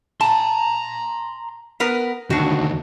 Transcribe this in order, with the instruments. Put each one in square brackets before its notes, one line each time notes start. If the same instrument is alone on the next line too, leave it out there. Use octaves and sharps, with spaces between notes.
[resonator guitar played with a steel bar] A5 [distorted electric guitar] A#5 C6
[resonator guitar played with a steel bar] B3 A#4 B4
[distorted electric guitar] D2 D#3 [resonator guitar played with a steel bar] D4 F#4